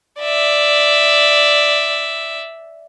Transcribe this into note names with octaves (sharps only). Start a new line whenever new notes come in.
D5 E5